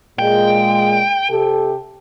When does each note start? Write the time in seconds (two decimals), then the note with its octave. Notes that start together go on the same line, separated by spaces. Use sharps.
0.19 A#2 G#3 G5
1.29 C3 G4 A4